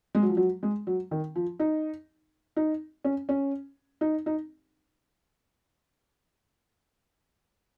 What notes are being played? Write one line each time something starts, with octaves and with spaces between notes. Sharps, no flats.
G#3
F#3
F3
F#3
G#3
F#3
D#3
F3
D#4
D#4
C#4
C#4
D#4
D#4